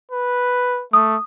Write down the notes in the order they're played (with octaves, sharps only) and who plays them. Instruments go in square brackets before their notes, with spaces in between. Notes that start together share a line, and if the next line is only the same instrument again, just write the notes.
[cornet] B4
[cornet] A3 [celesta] D#6